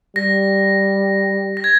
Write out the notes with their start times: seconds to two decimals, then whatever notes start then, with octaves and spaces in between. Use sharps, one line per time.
0.16 G3 A#6
1.57 A#6
1.64 G#6